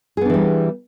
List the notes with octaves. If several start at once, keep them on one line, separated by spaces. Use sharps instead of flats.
E3 G3 B3 D4 G#4